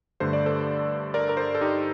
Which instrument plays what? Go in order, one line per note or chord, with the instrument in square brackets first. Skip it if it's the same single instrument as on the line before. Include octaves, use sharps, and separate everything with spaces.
[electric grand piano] G2 D3 A3 C5
D5
A4 C5
A#4 D5
A#4
A4 C5
A4
D#4 G4